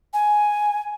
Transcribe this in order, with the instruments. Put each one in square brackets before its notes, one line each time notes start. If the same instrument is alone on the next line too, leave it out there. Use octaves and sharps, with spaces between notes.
[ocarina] G#5